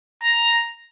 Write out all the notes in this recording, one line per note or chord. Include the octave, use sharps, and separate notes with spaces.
A#5